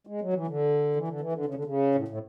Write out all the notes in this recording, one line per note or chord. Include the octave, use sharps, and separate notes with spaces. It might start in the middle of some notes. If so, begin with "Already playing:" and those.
G#3
F#3
E3
D3
E3
D3
E3
D3
C#3
D3
C#3
A2
A2